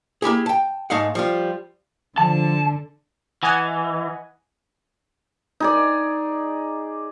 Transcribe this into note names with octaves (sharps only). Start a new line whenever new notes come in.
A#3 E4 G4 G#4
G5 A5
G#2 A3 D#4 F5 F#5
F3 G3 F4
D3 F3 A5
E3 D#5 F#5 G#5
D#4 G#4 D5